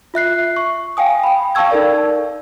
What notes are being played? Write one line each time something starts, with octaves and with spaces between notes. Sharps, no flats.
F4 E5 F#6 C7
C#6
F5 G5 G#5 D#6
G5 B5
F5 G5 A5 C#6 E6 G#6
D#4 A4 A#4 D5